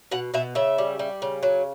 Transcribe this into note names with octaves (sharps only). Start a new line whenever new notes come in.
B2 F#5
B2 E5
C#3 E5
G3
G3
C#3
F#3